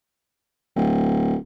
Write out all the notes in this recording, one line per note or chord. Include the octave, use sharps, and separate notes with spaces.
D1